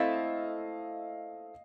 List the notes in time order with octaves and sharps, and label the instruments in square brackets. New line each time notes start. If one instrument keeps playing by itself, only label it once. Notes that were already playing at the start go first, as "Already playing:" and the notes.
Already playing: [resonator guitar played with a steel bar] A3 C4 E4 A4 [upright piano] D#5 F5